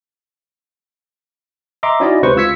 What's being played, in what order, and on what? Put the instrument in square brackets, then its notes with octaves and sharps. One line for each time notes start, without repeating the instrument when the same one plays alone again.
[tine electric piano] D#5 E5 A#5 C6 D6
C#4 D#4 E4 F#4 D5 D#5
C#2 C3 B4 C5 C#6
C#2 F4 E6 G#6 B6 C#7